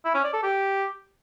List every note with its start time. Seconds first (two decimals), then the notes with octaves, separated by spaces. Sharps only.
0.05 E4
0.14 C#4
0.24 D5
0.33 A4
0.43 G4